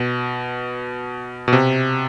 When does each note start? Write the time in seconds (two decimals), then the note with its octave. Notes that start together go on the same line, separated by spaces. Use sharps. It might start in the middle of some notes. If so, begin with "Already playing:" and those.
Already playing: B2
1.48 B2
1.53 C3